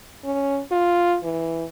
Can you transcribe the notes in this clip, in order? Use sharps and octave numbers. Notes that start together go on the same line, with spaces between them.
C#4
F4
E3